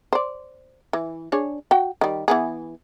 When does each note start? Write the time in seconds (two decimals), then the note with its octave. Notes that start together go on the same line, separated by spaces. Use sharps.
0.13 C5 D5
0.93 E3
1.32 D4 G#4 C#5
1.71 F#4 G5
2.01 D#3 G3
2.28 E3 B3 G#4